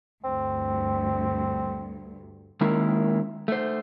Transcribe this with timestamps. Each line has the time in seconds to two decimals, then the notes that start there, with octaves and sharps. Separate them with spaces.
0.24 D2 G2 C4
2.61 D#3 G#3 A#3 C#4 E4 A#4
3.48 A3 C5